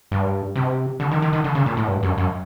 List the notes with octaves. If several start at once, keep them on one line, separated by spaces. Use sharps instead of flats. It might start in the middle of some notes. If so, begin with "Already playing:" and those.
G2
C3
D3
D#3
D#3
D#3
D3
C#3
A#2
A2
G2
F#2
F#2